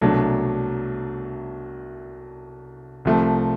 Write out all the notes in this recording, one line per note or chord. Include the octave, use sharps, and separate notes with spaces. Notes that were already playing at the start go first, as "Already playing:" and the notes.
C2 B2 F#3 A3 D4
C2 C3 F3 A3